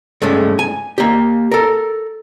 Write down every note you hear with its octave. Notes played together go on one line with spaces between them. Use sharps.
G2 G#3 A3 C#4
G#5
A#3 G4
A4 A#4